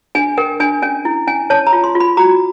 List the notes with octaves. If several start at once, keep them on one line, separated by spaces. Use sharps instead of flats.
D4 G#5
A#4 G5
D4 G#5
C#4 G#5
E4
C#4 G#5
C#5 A5
A#5
F4
C6
F4
B5
F#4 A#5